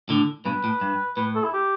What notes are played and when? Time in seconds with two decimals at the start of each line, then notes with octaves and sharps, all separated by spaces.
0.09 A2 D3
0.45 G2 B2 B4
0.64 A2
0.81 G2
1.17 A2 B4
1.35 A4
1.44 E4
1.53 G4